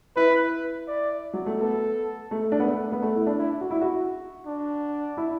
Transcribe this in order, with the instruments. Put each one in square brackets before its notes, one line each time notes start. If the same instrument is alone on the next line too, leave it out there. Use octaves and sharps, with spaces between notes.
[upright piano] E4 [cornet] B4
[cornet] D5
[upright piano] F#3
A3
[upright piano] B3 [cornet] A4
[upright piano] A3
D4
B3
A3
B3
A3
E4
D4
[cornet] E4
[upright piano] F#4
E4
F#4
[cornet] D4
[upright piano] E4